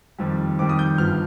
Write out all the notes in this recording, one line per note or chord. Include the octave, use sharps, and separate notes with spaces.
F2 D#3 G3
F2 D#3 G3 D6
D#6
G6
G1 G2 F3 F6